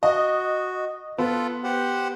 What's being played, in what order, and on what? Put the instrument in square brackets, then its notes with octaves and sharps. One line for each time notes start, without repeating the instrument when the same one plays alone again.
[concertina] F#4 [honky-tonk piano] D#5
[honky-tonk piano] B3 [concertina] F4 A4
[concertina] G4 C5 F#5